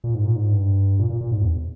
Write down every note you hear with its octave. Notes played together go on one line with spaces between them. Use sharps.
A#2
G#2
A#2
G#2
G2
A#2
A#2
A#2
G#2
E2